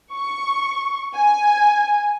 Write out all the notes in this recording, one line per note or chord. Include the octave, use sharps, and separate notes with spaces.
C#6
G#5